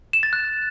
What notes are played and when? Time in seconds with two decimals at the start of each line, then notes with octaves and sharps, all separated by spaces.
0.13 E7
0.23 A6
0.33 F#6